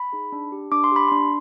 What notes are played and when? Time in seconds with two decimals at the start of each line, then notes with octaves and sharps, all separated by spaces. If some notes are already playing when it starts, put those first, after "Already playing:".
Already playing: B5
0.12 D#4 G#4
0.32 D4
0.52 G4
0.72 D4 D6
0.84 C6
0.92 G4 B5
1.08 D4 C6